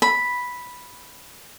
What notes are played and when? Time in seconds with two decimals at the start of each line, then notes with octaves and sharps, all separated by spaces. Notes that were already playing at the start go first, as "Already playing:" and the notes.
0.02 B5